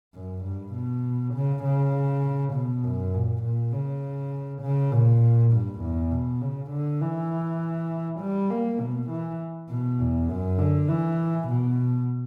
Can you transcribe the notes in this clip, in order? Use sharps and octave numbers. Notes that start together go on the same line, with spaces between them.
F#2
G2
B2
C#3
C#3
B2
F#2
A#2
A#2
C#3
C#3
A#2
G2
E2
B2
C#3
D3
E3
G3
A#3
B2
E3
B2
E2
F#2
D3
E3
B2